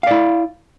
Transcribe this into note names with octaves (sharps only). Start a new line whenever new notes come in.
E4 D5 F5